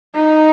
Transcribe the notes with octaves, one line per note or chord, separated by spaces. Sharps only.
D#4